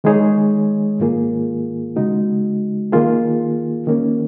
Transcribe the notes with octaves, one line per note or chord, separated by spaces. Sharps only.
D#3 G#3 D#4 G#4 C#5
G#2 D#3 A#3 F4 G#4
C#3 G#3 D#4 F#4
D#3 A#3 F4 G#4
D#3 A#3 C#4